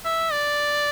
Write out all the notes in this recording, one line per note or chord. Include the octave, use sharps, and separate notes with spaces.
E5
D5